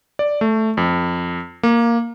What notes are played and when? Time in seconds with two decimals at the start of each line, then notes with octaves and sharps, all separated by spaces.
0.19 D5
0.41 A3
0.77 F2
1.63 A#3